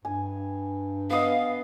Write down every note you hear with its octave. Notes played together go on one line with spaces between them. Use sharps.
G2 G#5
B3 D#5 F5